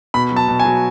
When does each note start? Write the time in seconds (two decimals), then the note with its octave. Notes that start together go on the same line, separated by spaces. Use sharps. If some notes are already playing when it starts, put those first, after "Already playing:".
0.14 B2 B5
0.31 F#3
0.36 A5
0.48 B2
0.60 G#5
0.65 F#3